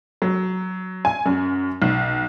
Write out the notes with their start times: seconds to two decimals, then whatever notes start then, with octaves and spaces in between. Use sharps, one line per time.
0.22 F#3
1.05 G#5
1.26 F#2
1.82 B1